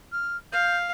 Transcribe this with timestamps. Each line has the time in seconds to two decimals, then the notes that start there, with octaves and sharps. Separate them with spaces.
0.12 F6
0.52 F5 G6